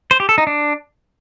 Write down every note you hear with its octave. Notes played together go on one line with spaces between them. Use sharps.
C5
G4
A4
D#4
D4